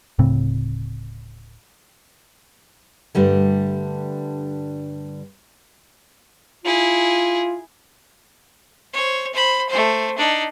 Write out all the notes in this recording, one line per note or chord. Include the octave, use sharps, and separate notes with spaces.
D1 A2 C#3 C4
G2 D3 G3 A3
E4 F4 G#4
C5 C#5
C5 B5
A3 C5
D4 D#4